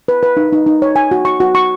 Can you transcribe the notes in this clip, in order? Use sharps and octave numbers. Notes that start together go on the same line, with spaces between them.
B4
B4
D#4
D#4
D#4
C#5
G#5
F#4
C#6
F#4
C#6